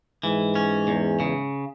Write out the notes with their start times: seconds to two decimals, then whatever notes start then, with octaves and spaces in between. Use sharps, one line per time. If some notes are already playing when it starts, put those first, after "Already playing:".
0.23 G#2 E3
0.55 C#4
0.88 E2
1.20 C#3